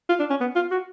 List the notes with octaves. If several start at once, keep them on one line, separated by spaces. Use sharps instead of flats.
F4
D4
C#4
B3
F4
F#4